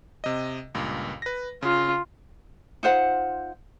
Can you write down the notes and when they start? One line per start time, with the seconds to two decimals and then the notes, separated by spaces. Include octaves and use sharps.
0.24 C3 D#5
0.74 C#2 G2 A#2
1.22 B4 A#6
1.62 C#3 F4
2.83 D#4 F4 C5 F#5